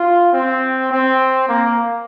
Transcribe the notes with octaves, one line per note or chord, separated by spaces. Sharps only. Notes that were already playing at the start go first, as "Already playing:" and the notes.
Already playing: F4
C4
C4
A#3